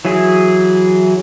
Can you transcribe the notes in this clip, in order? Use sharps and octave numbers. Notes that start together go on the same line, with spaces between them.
E3 F#3 E4 G#4